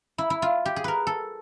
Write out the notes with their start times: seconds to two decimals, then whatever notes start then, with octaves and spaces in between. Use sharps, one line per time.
0.18 E4
0.30 E4
0.42 F4
0.66 G4
0.76 G#4
0.84 A#4 B4
1.07 A4